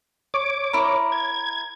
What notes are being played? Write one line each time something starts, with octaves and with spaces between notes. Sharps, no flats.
C#5 D6
E4 A#4
G#6